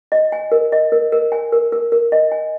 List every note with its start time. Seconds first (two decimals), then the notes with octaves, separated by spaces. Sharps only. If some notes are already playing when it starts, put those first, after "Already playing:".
0.12 D#5
0.32 G#5
0.52 A#4
0.72 D#5
0.92 A#4
1.12 A#4
1.32 G#5
1.52 A#4
1.72 A#4
1.92 A#4
2.12 D#5
2.32 G#5